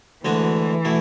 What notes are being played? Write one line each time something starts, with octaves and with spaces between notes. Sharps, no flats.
D2 D3 E3 G#3 D4 F#4
B2 A3 E4